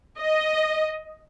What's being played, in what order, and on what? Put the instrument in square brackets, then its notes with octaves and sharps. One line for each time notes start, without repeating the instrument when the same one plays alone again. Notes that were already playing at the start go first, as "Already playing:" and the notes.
[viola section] D#5